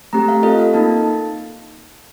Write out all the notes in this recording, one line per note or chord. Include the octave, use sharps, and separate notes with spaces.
A3 C4 G4 A#5
F5
C4 F4 A4 D#5
F5
A#3 D#4 A4 A5